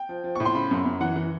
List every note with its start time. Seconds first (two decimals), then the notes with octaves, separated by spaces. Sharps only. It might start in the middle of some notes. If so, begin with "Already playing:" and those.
Already playing: G5
0.09 F3
0.24 F3
0.35 C#6
0.40 A2
0.45 C6
0.55 C#3 B5
0.71 F#2
0.85 F#2
1.00 E3 F#5
1.16 E3